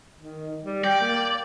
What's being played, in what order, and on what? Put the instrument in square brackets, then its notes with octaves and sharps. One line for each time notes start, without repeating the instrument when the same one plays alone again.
[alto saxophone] D#3
G3
[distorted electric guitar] D5 [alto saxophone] G5
[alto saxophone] A#3